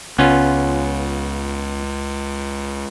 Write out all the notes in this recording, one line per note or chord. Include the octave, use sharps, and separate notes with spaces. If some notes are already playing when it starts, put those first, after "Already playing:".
C#2 B3 C#4 F4